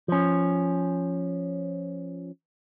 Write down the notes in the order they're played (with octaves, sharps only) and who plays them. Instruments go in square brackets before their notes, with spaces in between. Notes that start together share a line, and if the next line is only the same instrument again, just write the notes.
[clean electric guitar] F3 C#4